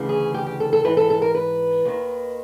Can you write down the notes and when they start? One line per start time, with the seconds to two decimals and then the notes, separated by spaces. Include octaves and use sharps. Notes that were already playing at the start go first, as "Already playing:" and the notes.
Already playing: D2 C#3 E3
0.09 G#4
0.34 G4
0.46 G4
0.60 A4
0.73 A4
0.84 G#2 E3 B4
0.97 A4
1.10 A4
1.22 A#4
1.35 B4
1.85 D#2 D#3